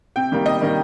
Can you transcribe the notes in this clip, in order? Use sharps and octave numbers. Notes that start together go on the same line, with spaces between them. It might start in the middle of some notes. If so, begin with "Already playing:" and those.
C3 G5
D#3 G3 A#3
C3 D#5
D#3 G3 A#3